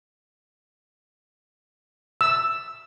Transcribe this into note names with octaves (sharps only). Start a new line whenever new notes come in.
E6